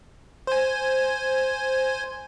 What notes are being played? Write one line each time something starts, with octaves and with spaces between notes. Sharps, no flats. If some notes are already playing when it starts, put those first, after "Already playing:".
C5 G#5